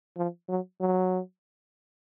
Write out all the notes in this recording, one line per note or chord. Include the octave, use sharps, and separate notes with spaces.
F3
F#3
F#3